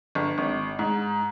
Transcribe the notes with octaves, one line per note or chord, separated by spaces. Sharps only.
G1
G#1
G#2